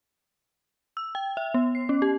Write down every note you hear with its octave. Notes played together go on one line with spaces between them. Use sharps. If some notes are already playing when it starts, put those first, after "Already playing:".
E6
G5
E5
B3
C7
C#4
G4